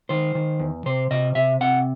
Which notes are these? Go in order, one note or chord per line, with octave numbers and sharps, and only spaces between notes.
D#3 C5
D#3
E2
C3 C5
C3 D#5
C3 E5
C3 F#5